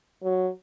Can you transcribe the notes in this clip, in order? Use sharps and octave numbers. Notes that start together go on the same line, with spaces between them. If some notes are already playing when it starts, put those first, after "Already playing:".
F#3